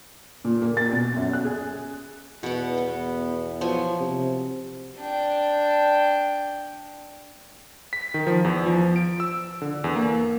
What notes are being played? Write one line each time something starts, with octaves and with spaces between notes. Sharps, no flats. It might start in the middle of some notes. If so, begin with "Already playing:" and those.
A#2
A#3
A6
B2
F#2
F#6
G#4
E2 B2 F#5
B3
F3 F#3 G#5
C3
D4 G5
B6
D#3
F3
E2
F3
D7
E6
D3
E2
A#3